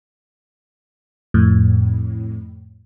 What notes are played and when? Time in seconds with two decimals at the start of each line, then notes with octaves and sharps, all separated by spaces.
1.34 F2 A2